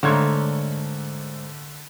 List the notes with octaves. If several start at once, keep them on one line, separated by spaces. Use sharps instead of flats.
G#2 D3 A3 A#3 C#5 G#6